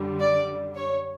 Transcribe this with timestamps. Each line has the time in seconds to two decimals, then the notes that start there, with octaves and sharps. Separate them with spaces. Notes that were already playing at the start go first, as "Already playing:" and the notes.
Already playing: F#2 D3 G3
0.21 D5
0.75 C#5